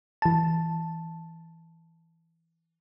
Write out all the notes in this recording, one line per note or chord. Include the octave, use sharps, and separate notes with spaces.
E3 A5